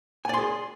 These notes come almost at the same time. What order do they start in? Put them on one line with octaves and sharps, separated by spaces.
G#5 D5 C6 G#4